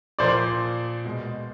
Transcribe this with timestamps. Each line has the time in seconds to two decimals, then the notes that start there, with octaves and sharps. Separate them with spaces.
0.19 A#2 F3 A#3 C5 D5
1.04 B2 G#3